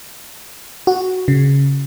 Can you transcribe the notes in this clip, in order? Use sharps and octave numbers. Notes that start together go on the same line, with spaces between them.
F#4
C#3